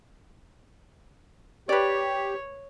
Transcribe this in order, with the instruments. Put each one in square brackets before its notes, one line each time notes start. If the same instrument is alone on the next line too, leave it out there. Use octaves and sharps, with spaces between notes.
[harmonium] G4 [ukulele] B4 D5 [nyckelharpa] C#5